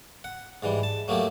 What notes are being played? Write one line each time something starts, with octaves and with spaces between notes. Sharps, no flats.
F#5
G#2 E3 G3
A5
F#3 A3 A#3 G4